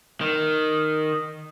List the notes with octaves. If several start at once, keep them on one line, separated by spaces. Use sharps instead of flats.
D#3